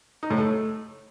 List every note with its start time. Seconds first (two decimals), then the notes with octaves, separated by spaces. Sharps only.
0.23 D#4
0.30 A2
0.38 A3